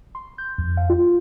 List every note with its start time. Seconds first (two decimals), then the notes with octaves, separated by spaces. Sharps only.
0.15 C6
0.38 G6
0.58 F2
0.77 F5
0.90 F4